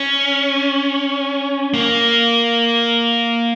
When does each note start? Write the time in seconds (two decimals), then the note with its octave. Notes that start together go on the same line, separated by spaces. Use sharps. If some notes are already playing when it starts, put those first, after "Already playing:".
Already playing: C#4
1.74 A#3